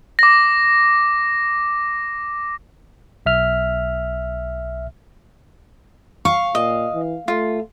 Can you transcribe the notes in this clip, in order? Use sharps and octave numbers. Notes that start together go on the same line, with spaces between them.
D6 A#6
B1 E5 F6
F5 C#6
A#2 D#5
E3
A3 F4